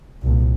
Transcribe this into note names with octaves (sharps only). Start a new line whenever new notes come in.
C2 A#2